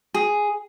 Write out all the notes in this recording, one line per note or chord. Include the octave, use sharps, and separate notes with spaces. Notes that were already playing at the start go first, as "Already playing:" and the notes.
G#4